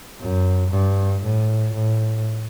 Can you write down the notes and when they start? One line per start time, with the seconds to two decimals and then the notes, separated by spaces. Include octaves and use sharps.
0.21 F#2
0.72 G2
1.23 A2
1.74 A2